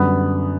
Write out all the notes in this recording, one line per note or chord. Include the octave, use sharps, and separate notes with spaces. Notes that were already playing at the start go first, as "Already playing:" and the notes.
Already playing: F#2 D3 G3 B3